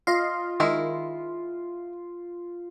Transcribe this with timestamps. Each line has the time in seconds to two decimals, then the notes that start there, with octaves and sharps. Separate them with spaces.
0.07 F4 D#5 F5
0.60 D#3 G#3 E4 A#4